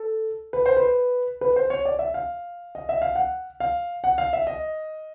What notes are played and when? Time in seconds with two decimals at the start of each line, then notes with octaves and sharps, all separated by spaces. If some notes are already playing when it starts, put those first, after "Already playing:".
Already playing: A4
0.53 B4
0.66 C5
0.77 B4
1.41 B4
1.56 C5
1.70 C#5
1.85 D5
1.99 E5
2.14 F5
2.75 D#5
2.89 E5
3.02 F5
3.15 F#5
3.60 F5
4.04 F#5
4.18 F5
4.33 E5
4.47 D#5